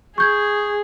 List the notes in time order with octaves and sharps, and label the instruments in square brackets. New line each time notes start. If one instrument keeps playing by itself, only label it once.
[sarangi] G#4 [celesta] C#6 G6 G#6